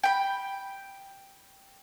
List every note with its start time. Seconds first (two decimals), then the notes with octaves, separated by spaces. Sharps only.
0.03 G5 B5